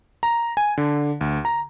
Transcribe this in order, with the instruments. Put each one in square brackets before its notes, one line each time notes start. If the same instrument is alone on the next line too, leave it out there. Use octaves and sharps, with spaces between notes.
[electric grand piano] A#5
G#5
D3
D2
A#5